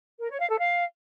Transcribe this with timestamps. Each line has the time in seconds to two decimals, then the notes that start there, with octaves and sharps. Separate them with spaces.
0.20 A#4
0.30 C#5
0.40 F5
0.49 A4
0.59 F5